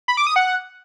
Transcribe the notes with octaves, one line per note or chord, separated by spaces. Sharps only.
B5
D6
D#6
F#5